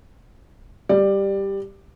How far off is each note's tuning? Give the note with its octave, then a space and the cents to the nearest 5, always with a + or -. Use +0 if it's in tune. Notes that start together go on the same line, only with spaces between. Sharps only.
G3 +5 D5 +15